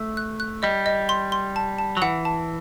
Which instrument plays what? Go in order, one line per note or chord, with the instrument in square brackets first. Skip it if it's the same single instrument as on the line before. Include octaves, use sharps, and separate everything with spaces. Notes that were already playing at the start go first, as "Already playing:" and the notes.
Already playing: [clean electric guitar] A3
[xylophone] F#6
F#6
[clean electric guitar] G3 [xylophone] D#5
[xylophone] D#5
C6
C6
A5
A5
[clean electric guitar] F#3
[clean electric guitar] E3 [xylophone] F#5
[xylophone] A5